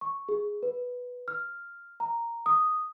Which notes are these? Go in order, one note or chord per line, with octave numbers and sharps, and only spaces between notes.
C#6
G#4
B4
F6
A#5
D#6